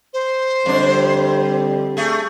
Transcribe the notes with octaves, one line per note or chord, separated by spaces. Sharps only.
C5
F2 D3 G3 D4
A3 G#4